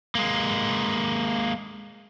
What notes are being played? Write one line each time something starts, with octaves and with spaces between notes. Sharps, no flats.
G#3 A#3